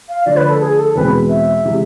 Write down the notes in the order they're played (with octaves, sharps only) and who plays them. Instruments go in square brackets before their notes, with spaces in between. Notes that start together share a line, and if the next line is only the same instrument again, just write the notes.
[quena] F5
[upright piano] D3 F3 A3 [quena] D5
[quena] B4
A4
G#4
A4
[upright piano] E2 B2 G#3 C4 [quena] B4
[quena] E5
[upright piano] C3 E3 G#3